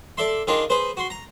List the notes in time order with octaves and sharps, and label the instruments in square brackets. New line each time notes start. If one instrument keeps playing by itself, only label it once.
[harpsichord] A4 D5 E5 C6
D#3 D4 F4 G#4 A#4
G#4 B4 C5
F#4 C6
A#5